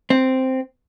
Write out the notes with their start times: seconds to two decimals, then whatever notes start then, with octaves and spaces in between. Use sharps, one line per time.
0.10 C4